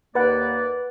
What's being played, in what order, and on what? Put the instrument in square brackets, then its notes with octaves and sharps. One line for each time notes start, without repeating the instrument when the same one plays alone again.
[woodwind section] D#2 A#3 D5 [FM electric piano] B4 F#5